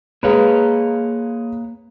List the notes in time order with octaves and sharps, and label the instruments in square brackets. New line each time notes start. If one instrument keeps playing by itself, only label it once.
[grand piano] G#3 B4 [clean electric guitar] A#3 C#5 F5